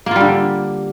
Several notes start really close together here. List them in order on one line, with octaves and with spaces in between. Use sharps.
A#3 F4 G3 D3